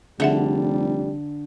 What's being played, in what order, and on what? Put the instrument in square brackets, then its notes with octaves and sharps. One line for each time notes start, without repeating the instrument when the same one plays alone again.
[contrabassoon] F1 [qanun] D3 [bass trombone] G3 [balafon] G#4 E5 F#5